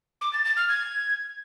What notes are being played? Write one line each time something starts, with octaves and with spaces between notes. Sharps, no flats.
D6
A6
A6
F6
G#6